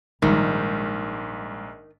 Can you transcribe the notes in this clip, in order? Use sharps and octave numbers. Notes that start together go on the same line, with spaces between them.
A#1 G#2 D#3 G3 G#3